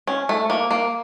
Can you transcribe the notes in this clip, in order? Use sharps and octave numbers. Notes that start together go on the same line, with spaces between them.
C#4
A3
A#3
A#3